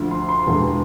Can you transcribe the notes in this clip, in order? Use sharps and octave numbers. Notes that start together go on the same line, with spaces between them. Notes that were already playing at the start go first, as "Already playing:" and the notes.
Already playing: D2 D3 F3
C6
C6
E1 E2 D3